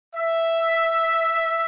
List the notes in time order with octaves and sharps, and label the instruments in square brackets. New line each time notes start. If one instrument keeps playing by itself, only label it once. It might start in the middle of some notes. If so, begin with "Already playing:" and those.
[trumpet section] E5